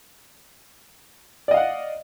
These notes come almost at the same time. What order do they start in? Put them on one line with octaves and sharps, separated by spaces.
D5 D#5 F5 F#5